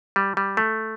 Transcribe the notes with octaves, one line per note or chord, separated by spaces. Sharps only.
G3
G3
A3